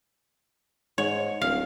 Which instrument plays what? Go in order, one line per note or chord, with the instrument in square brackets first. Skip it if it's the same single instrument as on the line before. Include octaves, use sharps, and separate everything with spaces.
[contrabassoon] G#2 [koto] C#5
[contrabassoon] D1 [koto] F5